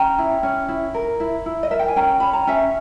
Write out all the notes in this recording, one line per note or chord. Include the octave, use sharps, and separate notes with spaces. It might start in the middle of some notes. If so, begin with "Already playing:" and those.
Already playing: C#4 G5 A#5
E4
C#4
E4
A#4
E4
E4
D#5
A#4 E5
G5
G#5
C#4 G5 A#5
C#4 B5
A#5
C#4 E5 G#5